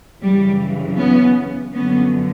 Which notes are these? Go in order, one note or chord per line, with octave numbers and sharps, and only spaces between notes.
F#2 C#3 E3 G3
B3 C#4
F#2 D3 F3 B3 C#4